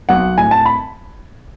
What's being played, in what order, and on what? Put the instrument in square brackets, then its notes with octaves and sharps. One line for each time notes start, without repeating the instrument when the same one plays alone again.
[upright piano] B1 F#5
A2 G#5
A5
B5